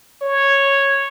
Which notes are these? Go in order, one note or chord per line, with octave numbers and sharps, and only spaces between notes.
C#5